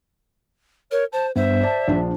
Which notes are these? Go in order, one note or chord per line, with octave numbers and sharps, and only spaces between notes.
A#4 C#5
C5 A5
G2 B3 C5 E5
D5 A5
A#1 F3 D4